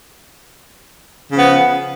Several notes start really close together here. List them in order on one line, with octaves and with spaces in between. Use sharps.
C#3 F3 B3